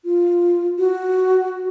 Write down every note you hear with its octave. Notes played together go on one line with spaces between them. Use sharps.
F4
F#4